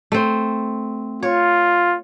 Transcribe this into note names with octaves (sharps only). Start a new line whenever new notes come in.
A3 C4
F4 C#5